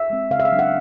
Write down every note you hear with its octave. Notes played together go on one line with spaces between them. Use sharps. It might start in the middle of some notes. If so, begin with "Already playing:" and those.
Already playing: E5
G#3 C4
C#3 F5
E5
F5
F#3 B3 D4
F#5